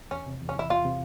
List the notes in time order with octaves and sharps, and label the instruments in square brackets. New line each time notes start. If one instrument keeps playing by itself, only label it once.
[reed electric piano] E2 [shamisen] C#4
[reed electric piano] C3
E2
[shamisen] C#4
[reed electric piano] E3 [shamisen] E4
[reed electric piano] E2 [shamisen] F4
[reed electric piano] C3